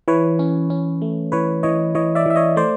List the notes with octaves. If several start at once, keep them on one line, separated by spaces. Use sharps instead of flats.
E3 B4 C#5
C#4
C#4
A3
E3 B4 C#5
E3 C#5 D#5
E3 C#5 D#5
D5 E5
E3 E5
C#5 D#5
A3 C5 D5